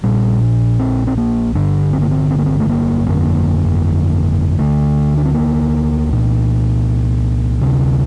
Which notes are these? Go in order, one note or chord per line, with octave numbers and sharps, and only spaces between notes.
A#1 A#2 G3
C4
C4
A#3
G1 G2 D3 D4
C4
A#3
C4
C4
A#3
C4
A3
A#3
G1 F2 D3 A#3
A3
A#3
D2 D3 A3
D4
C4
A#3
C2 A#2
D2 C3 D4